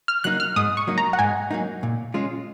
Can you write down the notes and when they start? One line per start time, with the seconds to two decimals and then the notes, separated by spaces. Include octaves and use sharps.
0.08 F6
0.24 F#3 A#3 D#4 F#6
0.40 F6
0.56 G#2 D#6
0.77 C#6
0.88 F#3 A#3 D#4
0.98 A#5
1.13 F#5
1.19 G#2 G#5
1.51 F#3 A#3 D#4
1.83 A#2
2.14 G#3 C#4 F4